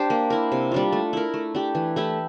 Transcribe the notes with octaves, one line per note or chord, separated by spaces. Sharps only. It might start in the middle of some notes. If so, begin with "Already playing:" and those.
Already playing: D4 G4 C5
A#3
E4 A#4
C3
G3 D4 F4
A3
E4 A#4
A3
D4 G4
E3
A3 E4 G4